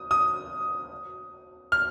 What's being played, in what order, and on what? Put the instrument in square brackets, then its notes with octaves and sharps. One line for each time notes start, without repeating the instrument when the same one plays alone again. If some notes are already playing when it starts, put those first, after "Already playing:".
Already playing: [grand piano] D#6
D#6
F6